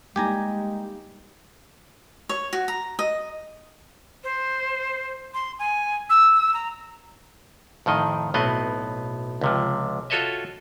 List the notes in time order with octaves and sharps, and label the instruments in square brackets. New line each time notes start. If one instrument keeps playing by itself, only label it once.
[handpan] G3 A#3 D#4 [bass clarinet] G#3 [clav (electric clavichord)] G4 G#5 A#5
[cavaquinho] C#5
F#4
A#5
D#5
[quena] C5
C6
G#5
E6
A#5
[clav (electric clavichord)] F2 A2 D#3 D#5
B1 A2 B3 C4 D#5
C#2 C3 F3
F4 F#4 A4 C#5 D#5 E5